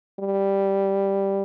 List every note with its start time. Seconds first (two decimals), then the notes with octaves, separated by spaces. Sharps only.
0.20 G3